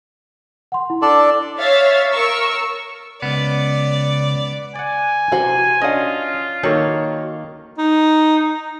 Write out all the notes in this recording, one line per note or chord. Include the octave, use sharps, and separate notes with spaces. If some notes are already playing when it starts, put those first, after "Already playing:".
F#5 C6
E4
D4 A4 D5 A5
C#5 E5 F5 A6
A#4 C#6 E6
C#2 C#3 B3 D5
D5 F#5 G#5
C3 E3 F#4 C5
C#4 D4 F4 D#5 F#5
D#3 A#3 F#4 A4 C#5
D#4